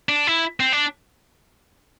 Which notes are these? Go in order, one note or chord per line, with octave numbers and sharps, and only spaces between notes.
D4
E4
C4
D4